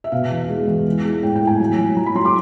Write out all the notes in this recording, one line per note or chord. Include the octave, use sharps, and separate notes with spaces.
E5
B2 F5
E2
G#3
E2
E3
G#3
A2 G5
G5
A2
G#5
F#3
F#3
F#3 A#5
B5
F#3 C6
D6